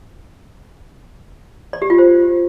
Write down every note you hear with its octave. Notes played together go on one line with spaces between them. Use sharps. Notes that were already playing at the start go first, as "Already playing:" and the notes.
D5
G4
F4
C5